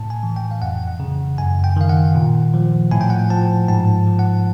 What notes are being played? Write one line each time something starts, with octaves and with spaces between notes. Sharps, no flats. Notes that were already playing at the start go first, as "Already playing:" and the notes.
Already playing: A2 A5
G#5
E3
G5
F5
F2 F#5
F#5
C#3
F#2 G#5
G5
D#3 F5
F#5
A#2
F3
A2 G#5
G5
F#5
G5
F3 A5
G#2 A5
F3
F#5